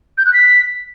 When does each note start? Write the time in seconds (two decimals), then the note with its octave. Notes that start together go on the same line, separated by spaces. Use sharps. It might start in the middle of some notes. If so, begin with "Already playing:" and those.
0.18 G6
0.25 F#6
0.33 B6